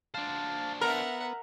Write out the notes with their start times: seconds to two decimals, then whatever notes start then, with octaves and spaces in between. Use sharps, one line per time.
0.14 D4 C5 F5 A5
0.81 B3 A#4 E5 F#5